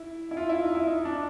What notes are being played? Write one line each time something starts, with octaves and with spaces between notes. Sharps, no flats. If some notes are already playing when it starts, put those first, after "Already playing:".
Already playing: E4
E4
F4
E4
D#4
E4
D#4
D4